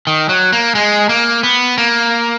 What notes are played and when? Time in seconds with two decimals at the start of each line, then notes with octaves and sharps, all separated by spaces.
0.07 D#3
0.29 F#3
0.52 A#3
0.75 G#3
1.09 A#3
1.43 B3
1.78 A#3